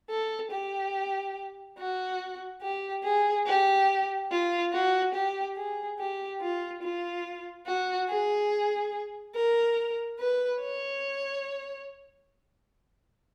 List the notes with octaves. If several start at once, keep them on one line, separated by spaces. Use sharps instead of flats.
A4
G4
F#4
G4
G#4
G4
F4
F#4
G4
G#4
G4
F4
F4
F#4
G#4
A#4
B4
C#5